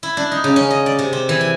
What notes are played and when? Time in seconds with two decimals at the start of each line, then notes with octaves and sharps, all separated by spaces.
0.03 E4
0.17 D4
0.31 D#4
0.44 C#3
0.56 C#4
0.71 D#5
0.86 D5
0.99 C3
1.13 C4
1.29 E3
1.41 G#5